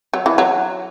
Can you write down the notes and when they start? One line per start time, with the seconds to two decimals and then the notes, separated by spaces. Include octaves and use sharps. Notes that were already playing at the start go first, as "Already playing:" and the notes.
0.14 F#3
0.26 E3
0.38 F#3